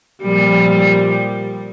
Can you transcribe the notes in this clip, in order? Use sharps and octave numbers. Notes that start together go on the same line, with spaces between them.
A#2 F3 G3